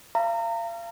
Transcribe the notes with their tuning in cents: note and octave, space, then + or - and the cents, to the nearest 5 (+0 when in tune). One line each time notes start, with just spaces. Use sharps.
F5 -35 A#5 -30